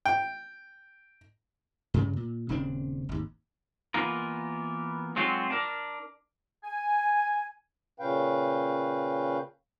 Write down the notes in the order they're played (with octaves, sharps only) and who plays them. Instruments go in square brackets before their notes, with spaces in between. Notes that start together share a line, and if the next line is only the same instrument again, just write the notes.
[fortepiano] G5
[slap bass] G2 C#3
A#2
D#1 C#3 C4 D4
G#1 D#2
[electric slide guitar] E3 A#3 B3 F4 A#4
F#3 G#3 C4 F4 F#4
D4 A#4
[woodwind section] G#5
[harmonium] A#2 C#3 C#4 B4 F5 G5